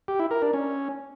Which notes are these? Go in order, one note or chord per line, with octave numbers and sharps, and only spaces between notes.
G4
E4
A#4
D4
C#4